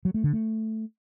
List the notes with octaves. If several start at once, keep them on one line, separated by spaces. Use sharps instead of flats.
F#3
A3
D3
A3